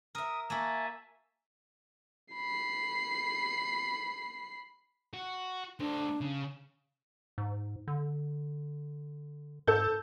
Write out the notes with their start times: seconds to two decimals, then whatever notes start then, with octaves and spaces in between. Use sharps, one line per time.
0.15 A#4 E5 D#6
0.50 A#3 F#4 E5 G#5 A5
2.34 B5 C7
5.14 F#4
5.80 A3 D4 C5
6.21 C#3
7.38 G#2
7.88 D3
9.67 G#2 A4 G6